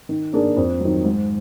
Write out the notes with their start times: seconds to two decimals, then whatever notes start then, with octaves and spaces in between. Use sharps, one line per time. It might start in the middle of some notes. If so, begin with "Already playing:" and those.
0.09 D#3
0.33 A#3 D4 G#4
0.57 F2
0.80 D#3 F#3
1.04 G#2